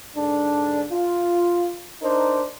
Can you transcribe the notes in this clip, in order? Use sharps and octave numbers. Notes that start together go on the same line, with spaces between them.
G#2 D3 D4
F4
D4 D#4 A#4 C5